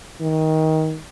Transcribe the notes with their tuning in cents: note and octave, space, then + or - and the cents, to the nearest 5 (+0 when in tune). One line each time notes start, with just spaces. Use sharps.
D#3 +20